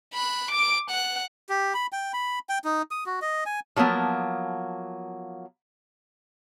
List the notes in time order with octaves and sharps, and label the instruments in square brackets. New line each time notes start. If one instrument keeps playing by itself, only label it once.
[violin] B5 F#6
D6 D7
F#5 F#6
[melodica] G4
B5
G5
B5
G5
D#4
D#6
F#4
D#5
G#5
[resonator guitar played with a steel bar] F3 F#3 A#3 B3 A5